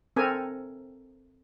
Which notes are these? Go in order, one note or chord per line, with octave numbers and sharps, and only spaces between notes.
C4 A4 A#4 G#5